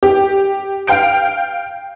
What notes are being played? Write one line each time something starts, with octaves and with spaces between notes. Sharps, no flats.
G4
F5 G5 G6 D7